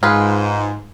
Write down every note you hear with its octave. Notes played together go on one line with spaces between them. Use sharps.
G#2 F4 G#4 B4